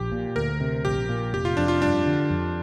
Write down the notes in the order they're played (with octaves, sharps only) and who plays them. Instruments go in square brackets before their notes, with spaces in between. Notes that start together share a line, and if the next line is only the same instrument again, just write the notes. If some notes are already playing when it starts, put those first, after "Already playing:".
Already playing: [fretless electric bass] A#1 [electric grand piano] G4
[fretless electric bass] A#2
[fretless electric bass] D2 [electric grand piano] A#4
[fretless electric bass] C3
[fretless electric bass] A#1 [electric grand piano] G4
[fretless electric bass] A#2
[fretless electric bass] F1 [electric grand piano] G4
[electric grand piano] F4
[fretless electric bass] F2 [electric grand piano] D4
[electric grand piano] F4
[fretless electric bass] G2 [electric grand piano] D4
[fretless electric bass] D3
F2